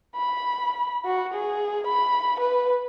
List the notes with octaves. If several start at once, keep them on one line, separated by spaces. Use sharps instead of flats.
B5
F#4
G#4
B5
B4